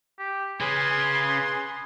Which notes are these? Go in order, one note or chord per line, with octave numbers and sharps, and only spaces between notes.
G4
C#3 G#4 B4 G#5 C6